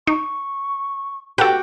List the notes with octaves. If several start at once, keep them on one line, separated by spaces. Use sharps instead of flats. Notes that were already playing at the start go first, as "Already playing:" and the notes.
D#4 C#6
F#4 G4 A4 B4 F#5 G5